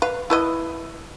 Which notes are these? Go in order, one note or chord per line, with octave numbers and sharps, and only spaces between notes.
B4 F5
E4 B4 D#5